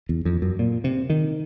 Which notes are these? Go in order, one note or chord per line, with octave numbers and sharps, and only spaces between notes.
E2
F2
F#2
A#2
C3
D#3